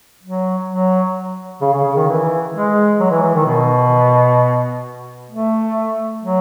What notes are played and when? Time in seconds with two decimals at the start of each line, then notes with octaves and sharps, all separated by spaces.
0.23 F#3
0.68 F#3
1.61 C#3
1.73 C#3
1.84 C#3
1.96 D#3
2.08 E3
2.54 G#3
3.00 F#3
3.11 E3
3.22 E3
3.35 D#3
3.46 B2
5.30 A3
6.23 F#3